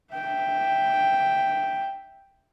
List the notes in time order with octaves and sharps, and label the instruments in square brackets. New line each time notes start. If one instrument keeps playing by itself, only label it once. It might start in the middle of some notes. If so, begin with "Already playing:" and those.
[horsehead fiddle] E5 G5